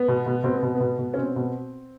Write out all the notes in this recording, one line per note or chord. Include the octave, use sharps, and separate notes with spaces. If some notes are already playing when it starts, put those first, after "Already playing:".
Already playing: B3
B2
B2
B2 C4
B3
B2
B3
B2
B2
C#4
B2 C4
B2